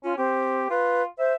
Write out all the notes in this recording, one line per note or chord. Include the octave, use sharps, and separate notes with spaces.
C#4 F4
C4 G4
F4 B4
C5 E5